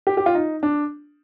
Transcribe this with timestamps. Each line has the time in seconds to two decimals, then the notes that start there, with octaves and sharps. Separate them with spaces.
0.07 G4
0.17 G4
0.26 F4
0.35 D#4
0.63 D4